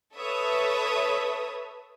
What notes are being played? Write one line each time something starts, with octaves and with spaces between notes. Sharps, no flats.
A4 B4 C#5 E5 D#6